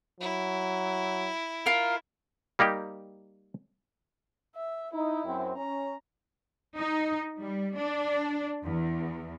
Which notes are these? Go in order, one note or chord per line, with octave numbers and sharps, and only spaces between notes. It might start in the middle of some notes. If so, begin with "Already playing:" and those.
F#3 E4
F4 A#4
G3 A#3 D#4 G4
E5
D#4 E4
F#2 C4
C#4 A#5
D#4
G3
D4
E2